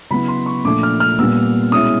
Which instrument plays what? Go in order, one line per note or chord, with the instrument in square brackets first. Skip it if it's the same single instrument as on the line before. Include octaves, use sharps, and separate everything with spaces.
[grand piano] C#3 F#3 B3 E4 B5
C6
C#6
A#2 F3 A3 D4 D6
F6
F6
A#2 G3 B3 E6
B2 G#3 C#4 E4 D#6